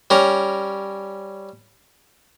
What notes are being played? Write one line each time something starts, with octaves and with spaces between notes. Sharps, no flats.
G3 C#4 A#4